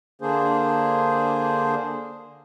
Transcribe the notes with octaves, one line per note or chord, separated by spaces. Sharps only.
D3 A#3 D4 G#4 C5